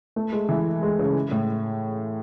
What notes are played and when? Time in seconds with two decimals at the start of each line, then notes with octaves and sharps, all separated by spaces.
0.16 A3
0.33 G#3
0.49 E3
0.83 G#3
0.99 C#3
1.31 A2